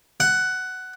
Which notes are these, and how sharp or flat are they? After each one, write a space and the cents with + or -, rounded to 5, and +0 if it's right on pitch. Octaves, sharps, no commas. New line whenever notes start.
F#5 +10